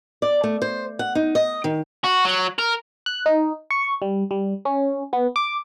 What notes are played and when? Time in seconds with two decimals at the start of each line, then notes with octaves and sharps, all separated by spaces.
0.22 D5
0.44 A3
0.62 C5
0.99 F#5
1.15 D#4
1.35 D#5
1.64 D#3
2.04 F#4
2.25 F#3
2.59 A#4
3.06 F#6
3.26 D#4
3.70 C#6
4.02 G3
4.31 G3
4.65 C#4
5.13 B3
5.36 D6